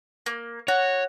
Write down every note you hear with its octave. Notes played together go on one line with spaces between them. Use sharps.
A#3
F#4 C#5